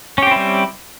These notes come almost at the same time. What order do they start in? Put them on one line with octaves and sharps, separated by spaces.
C#4 G4 C4 E4 G3